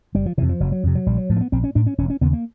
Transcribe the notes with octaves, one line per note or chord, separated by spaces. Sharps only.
F#1 G3
F3
F2 C3 E3
F3
F#1 F#3
F#3
F2 C3
F#3
A#1 G3
F#3
A2 F3
A#3
B3
A#1 C4
C#4
A2 D4
C#4
E1 C#4
C#4
D#2 C#3 B3
A#3